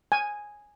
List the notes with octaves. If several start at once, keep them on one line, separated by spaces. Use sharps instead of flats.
G#5